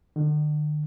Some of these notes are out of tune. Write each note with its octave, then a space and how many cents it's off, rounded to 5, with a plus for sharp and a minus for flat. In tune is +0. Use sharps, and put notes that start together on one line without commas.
D3 +45